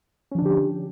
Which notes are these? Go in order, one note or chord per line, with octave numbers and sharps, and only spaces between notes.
D3 F3 C#4 D4 G4